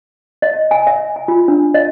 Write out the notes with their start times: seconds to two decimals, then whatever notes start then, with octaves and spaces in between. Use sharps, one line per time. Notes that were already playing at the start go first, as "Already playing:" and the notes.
0.42 D#5
0.71 G#5
0.87 E5
1.16 G#5
1.28 F4
1.48 D4
1.74 D#5